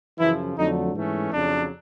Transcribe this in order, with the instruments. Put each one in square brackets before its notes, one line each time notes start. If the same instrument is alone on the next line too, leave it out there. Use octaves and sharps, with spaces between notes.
[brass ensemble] F#2 C#3 E3 F3 E4
F2 D3 F#3 A3 D4 D#4
G#2 E3 A3 C#4
F2 C#3 F#3 D4